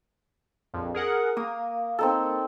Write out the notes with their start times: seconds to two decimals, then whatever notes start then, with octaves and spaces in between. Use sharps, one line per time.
0.74 A#1 F2
0.94 G#4 A#4 F#5
1.37 A#3 D#6
1.99 C4 D#4 A4